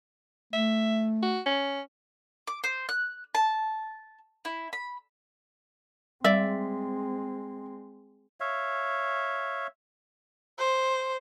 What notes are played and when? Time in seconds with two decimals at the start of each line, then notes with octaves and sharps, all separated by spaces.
0.53 A3 E5
1.23 F#4
1.46 C#4
2.47 D6
2.64 C5
2.89 F#6
3.35 A5
4.45 E4
4.73 B5
6.24 G3 G#3 C4 D5 E5
8.40 C#5 E5 F5
10.58 C5